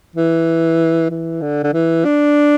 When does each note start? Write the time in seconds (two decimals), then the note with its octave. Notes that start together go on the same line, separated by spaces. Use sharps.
0.16 E3
1.10 E3
1.42 D3
1.64 D3
1.73 E3
2.05 D4